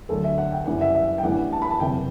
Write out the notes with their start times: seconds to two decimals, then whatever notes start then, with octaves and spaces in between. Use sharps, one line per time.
0.09 D2 D3 F#3 A4
0.24 E5
0.38 F#5
0.52 G5
0.66 F#1 F#2 E3 G3 F#5
0.81 E5
0.95 E5
1.18 G5
1.23 A1 G2 E3 G3 F#5
1.53 A5
1.62 B5
1.70 A5
1.80 F#1 E2 C3 E3 G5